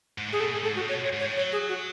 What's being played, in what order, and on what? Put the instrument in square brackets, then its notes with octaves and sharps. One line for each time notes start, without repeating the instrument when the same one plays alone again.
[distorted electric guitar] G#2
[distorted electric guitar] A2 [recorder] G#4
[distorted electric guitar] B2 [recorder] A4
[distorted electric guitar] A2 [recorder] G#4
[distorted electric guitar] G#2 [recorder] A4
[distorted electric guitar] A2 [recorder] F#4
[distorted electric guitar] B2 [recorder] C#5
[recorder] C#5
[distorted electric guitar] G#2
[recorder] C#5
[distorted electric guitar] A2
[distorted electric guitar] F#3 [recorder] C#5
[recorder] G#4
F#4